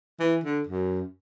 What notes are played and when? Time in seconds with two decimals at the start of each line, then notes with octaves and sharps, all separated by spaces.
0.20 E3
0.43 D3
0.67 F#2